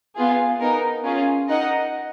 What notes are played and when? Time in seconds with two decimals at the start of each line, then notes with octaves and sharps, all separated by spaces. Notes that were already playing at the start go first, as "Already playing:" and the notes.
0.16 B3 F4 G#4
0.60 B3 D#4 A#4
1.04 C#4 F4 G#4
1.48 D#4 A#4 D#5 F#5